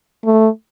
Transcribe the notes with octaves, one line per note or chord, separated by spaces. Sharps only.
A3